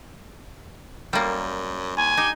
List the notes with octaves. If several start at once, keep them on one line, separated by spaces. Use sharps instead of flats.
F#2 G3 A#3
D#2 G#5
D#4 G4